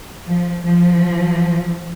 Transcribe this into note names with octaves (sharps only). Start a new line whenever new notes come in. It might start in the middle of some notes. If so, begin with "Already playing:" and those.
F3
F3